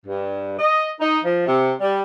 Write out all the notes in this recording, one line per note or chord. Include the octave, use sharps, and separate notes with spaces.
G2
D#5
D#4
F3
C3
G3